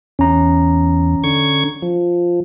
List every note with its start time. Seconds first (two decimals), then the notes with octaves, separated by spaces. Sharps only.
0.19 E2 C#4 A#5
1.24 D3 C#6 G#6
1.82 F3